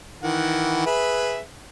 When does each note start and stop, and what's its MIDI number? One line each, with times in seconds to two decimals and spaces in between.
0.23 0.84 51
0.23 0.84 52
0.23 0.84 78
0.86 1.40 68
0.86 1.40 71
0.86 1.40 76